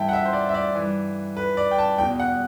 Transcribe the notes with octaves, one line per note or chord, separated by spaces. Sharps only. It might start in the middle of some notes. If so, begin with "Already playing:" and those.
Already playing: G2 E3 E5 G5 A5
F#5
E5
C5
D5
E5
D5
G2 E3
B4
D5
G5
A5
E2 B2 G5
F#5